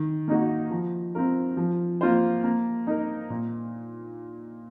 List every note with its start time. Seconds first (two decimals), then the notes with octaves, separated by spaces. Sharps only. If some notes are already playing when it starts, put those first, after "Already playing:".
Already playing: D#3
0.28 A#3 D#4 F#4
0.71 F3
1.15 C4 F4 A#4
1.57 F3
2.01 A#3 F4 C5
2.44 A#3
2.87 D#4 A#4
3.30 A#2